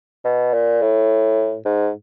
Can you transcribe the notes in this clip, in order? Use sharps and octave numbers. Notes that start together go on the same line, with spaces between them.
B2
A#2
A2
G#2